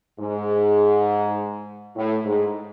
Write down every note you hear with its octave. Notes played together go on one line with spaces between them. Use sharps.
G#2
A2
G#2